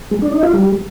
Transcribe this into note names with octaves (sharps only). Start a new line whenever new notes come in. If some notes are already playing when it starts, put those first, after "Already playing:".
G#3
D4
D#4
F4
G3